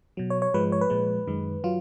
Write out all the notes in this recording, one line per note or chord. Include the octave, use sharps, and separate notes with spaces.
B2 F#3
C#5
C#5
G#2 F3 G#3 B4
C#5
B4
A#2 F3 G#3
F#2 D#3 G#3
F#3 F4